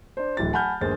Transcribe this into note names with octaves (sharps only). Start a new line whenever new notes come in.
D4 C5
D1 E3 A6
F#5 G#5 A5 B5 F6 G6
G1 D#2 G#4 C5 A6